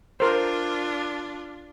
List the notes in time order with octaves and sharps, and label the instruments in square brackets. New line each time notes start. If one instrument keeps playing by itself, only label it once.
[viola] D4 F4 [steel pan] A#4 C5